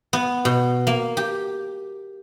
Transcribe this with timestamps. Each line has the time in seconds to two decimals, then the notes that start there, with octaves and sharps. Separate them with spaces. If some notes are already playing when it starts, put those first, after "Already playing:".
0.13 B3
0.45 B2
0.87 A#3
1.17 G4